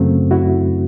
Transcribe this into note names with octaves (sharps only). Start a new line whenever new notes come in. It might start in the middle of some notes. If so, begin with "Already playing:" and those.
Already playing: F#2 C#3 F#3 A3 C4
E4 F#4